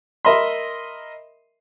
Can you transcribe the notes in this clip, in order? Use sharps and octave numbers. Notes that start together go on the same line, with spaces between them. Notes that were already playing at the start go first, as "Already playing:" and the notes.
A#4 D#5 E5 B5 C6